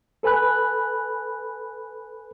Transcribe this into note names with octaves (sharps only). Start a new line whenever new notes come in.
A4 B4 G#5 B5 F#6